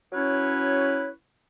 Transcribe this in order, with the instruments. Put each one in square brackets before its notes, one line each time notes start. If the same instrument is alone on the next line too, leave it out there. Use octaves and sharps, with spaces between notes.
[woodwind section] F#3 C#4 E4 B4 C#5